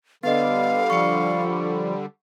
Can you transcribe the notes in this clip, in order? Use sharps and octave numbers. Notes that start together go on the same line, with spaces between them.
D3 G3 B3 B4 D#5 F5
F3 C#6 C#7